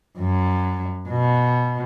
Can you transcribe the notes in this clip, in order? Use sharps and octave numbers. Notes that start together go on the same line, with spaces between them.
F#2
B2